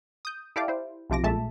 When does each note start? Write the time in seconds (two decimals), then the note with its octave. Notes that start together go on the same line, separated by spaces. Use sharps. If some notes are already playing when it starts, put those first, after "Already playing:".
0.25 D#6 G6
0.56 E4 G4 A4 D5 F5 D6
0.68 E4 C5
1.10 B1 C3 F3 D6 A#6
1.23 A#1 A#2 G#3 A3 E5 A5